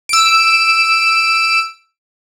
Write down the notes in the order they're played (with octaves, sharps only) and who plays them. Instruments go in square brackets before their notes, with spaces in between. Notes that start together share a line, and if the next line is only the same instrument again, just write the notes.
[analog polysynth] E6 D7